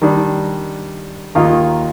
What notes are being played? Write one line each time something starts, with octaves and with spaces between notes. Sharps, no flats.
D#3 G3 D4
D#2 D#3 A#3 F4